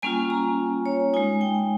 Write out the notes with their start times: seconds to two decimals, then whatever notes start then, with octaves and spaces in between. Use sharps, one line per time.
0.02 G3 A#3 C#4 F4 G#5
0.30 A#5
0.86 C#5
1.14 G#3 D#4 G#5
1.41 G5